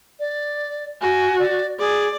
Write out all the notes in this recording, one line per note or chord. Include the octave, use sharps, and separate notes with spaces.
D5
F#4 G#5
D5
G#4 D5